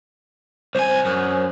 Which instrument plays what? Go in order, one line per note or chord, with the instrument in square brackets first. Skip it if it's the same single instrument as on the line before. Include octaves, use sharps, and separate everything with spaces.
[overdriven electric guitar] C2 G#5 [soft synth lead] C5
[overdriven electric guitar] F#2